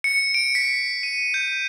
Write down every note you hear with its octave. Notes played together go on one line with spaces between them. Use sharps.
C#7
D7
B6
D#7
G6